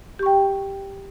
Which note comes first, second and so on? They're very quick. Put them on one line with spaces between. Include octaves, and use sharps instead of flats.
G4 C#6 G5